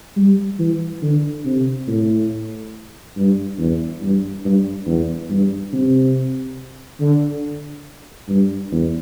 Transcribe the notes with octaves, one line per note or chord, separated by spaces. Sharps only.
G3
E3
D3
C3
A2
G2
E2
G2
G2
E2
G2
C3
D3
G2
E2